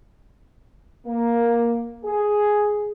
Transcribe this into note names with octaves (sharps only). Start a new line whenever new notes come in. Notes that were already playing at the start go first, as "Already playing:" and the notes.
A#3
G#4